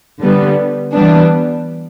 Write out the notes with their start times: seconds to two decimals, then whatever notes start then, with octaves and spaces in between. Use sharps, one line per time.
0.21 D3 G3 B3
0.93 E3 G3 B3 D4